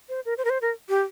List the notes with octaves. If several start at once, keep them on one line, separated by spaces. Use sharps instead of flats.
C5
A#4
C5
A#4
C5
A#4
G4